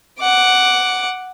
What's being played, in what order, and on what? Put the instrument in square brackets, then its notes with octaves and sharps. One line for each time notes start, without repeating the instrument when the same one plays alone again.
[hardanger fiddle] F#5 D6